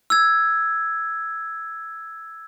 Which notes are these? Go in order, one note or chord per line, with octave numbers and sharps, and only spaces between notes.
E6 G#6